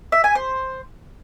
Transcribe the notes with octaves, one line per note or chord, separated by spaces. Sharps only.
E5
G#5
C5